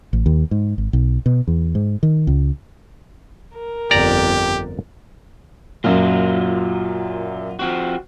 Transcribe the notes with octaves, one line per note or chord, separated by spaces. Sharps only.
A1
D#2
G#2
G#1
B1
B2
E2
G#2
D#3
C#2
A#4
G1 F2 G4 D5 A#5
F#2 A#2 F#3 F4
F3 C4 F#4